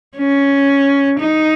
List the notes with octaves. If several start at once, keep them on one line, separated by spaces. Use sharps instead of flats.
C#4
D#4